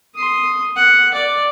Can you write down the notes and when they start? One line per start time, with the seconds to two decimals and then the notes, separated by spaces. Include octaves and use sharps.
0.16 C6 D#6
0.76 F#5
1.14 D5